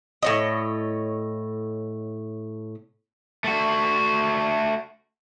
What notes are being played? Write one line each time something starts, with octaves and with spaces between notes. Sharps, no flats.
A2 C#5 D#5
A3 F#4